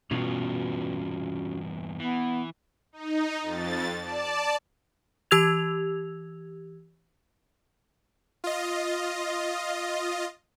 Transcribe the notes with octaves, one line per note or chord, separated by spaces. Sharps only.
E2 G2 B2 C#4 F4 F#4
E3 B3
D#4
F2 A6
D5 A5
E3 G4 E6 G#6 F7
F4 D#5